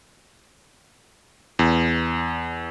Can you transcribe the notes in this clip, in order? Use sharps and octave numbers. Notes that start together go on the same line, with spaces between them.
E2